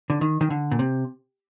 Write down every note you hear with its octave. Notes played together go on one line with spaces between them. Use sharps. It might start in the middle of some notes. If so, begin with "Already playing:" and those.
D3
D#3
D#3
D3
A#2
C3